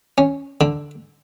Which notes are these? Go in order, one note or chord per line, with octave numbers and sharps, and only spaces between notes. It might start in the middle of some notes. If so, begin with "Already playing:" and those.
C#4
D3